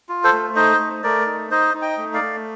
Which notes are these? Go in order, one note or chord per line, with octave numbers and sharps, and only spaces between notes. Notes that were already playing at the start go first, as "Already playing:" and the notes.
F4
A4 C5
A3
D#4 C5 D#5
A3
A3 A#4 D5
D#4
D#4 C5 D#5
D#4
D#5 G5
A3
D5 F5
A3